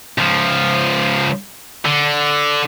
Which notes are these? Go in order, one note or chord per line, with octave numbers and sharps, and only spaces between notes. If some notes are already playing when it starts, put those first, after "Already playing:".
C#2 F3
D3